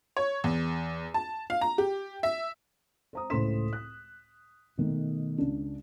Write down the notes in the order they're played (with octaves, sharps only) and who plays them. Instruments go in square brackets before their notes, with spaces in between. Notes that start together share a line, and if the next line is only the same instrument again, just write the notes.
[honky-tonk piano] C#5
E2
A5
F5
A#5
G4
E5
[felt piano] C5 A#5 D#6
C#2 A2 C5 C6 B6 E7
F#6
B2 D#3 A3
C#2 D4